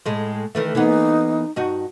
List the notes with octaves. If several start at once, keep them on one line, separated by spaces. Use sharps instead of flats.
A2 G#3
D#3 E3 A3
E3 A#3 B3 D#4
G2 D#4 F#4